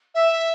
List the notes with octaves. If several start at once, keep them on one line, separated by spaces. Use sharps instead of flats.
E5